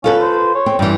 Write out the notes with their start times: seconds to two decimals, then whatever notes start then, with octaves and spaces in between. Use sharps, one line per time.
0.04 C#4 F4 A4 B4
0.21 C5
0.55 C#5
0.66 C4
0.79 G2 E3 G3